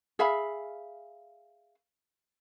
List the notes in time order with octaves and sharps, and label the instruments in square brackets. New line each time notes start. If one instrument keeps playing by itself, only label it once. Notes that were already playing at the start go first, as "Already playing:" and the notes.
[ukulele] G#4 E5 F5 B5